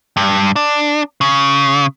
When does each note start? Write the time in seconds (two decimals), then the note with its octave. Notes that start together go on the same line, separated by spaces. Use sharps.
0.17 G2
0.56 D4
1.21 C#3